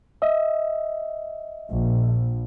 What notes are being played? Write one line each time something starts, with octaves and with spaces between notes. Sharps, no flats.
D#5 E5
A#1